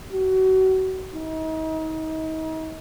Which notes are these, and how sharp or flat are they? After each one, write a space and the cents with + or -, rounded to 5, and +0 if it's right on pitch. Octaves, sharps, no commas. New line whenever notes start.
F#4 +30
D#4 +35